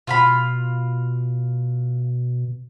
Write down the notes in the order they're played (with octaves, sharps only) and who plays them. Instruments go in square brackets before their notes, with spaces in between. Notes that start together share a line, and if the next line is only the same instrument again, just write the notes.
[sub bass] B2 [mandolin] F4 F5 B5